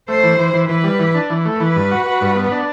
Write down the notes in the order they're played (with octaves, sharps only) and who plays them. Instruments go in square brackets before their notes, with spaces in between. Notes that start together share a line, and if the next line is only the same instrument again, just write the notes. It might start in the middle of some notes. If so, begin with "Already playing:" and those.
[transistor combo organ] A3 [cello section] C5
[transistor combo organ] E3
E3
E3
[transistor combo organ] E3 [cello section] B4
[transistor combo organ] G3
E3
D4
E3
A3
[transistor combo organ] E3 [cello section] B4
[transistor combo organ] G2
F#4
F#4
G2
B3
D4